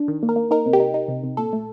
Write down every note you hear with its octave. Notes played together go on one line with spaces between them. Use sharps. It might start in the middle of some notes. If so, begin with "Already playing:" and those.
Already playing: D4
D#3
A#3
A#4
A#3
D#4 A#4
C3
G4
D#4
D#4
C3
C3
A#2 A4
A3